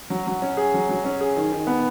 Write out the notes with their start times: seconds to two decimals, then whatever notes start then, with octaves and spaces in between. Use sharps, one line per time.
0.10 F#3
0.27 F#3
0.42 C#4
0.57 G#4
0.74 F#3
0.89 F#3
1.04 C#4
1.21 G#4
1.36 D#3
1.52 D#3
1.67 B3